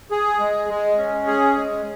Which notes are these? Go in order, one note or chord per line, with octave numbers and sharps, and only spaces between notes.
G#4
G#3
G#3
C#4
G#4
G#3